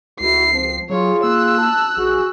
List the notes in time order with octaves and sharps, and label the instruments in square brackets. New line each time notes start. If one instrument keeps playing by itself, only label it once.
[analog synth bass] C#2 [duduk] E4 [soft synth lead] F#4 [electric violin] C7
[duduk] F3 [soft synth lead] C4
[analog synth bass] F#3 [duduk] F4 [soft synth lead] G#4 [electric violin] C#5
[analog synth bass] A#3 [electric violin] E6 F#6
[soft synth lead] A5
[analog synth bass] A#1 [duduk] F#4 [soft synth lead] G#4